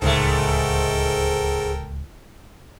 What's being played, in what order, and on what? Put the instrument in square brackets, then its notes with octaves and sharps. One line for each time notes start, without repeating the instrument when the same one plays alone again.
[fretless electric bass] D1 C#2 [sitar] G#2 A3 [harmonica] A4 A#4 G5